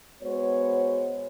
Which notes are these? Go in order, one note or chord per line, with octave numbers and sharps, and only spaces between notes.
G#3 B3 F#4 C5 C#5